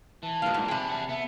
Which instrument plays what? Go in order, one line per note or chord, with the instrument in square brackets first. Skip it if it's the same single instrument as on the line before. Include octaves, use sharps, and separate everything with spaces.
[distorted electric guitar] E3 [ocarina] A5
[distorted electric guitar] G2 A#2 [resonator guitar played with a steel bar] G#3 F5
[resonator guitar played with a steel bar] G#2
[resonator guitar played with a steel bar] C3 G#4 [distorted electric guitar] G5 B5
[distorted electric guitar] E5 F#5
[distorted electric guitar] B3 [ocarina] E5